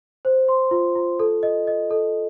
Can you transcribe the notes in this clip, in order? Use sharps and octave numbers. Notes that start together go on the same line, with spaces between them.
C5
C6
F4
F4
A4
D#5
D#5
A4